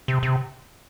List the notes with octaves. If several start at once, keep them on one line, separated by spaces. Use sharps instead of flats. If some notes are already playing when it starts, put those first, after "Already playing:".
C3
C3